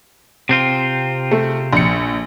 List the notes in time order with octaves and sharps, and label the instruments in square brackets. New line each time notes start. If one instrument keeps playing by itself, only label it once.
[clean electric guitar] C3 C4 F4
[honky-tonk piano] A3
A#1 C#7